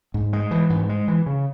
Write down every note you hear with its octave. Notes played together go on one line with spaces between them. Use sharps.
G#2
G#3
E3
G#2
G#3
E3
C#3